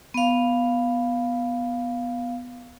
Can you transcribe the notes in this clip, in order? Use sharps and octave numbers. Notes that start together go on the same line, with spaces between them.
B3 F5